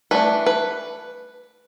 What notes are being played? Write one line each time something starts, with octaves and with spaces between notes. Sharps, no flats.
E3 A3 D4 B4
B4